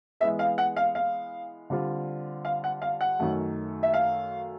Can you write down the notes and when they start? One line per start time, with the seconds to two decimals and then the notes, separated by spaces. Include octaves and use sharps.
0.20 E3 G#3 B3 E5
0.39 F5
0.58 F#5
0.76 F5
0.95 F5
1.70 D3 G3 C4 F4
2.45 F5
2.64 F#5
2.82 F5
3.01 F#5
3.20 F#2 D#3 F#3 A3
3.83 E5
3.94 F5